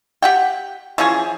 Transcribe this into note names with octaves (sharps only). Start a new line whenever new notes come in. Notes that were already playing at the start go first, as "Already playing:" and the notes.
G4 F#5 G5
E3 F3 C#4 G#4